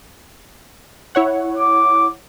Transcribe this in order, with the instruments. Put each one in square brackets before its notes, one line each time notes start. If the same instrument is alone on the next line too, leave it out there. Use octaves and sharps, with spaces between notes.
[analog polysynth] E4 C#5 F#5
[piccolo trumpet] D6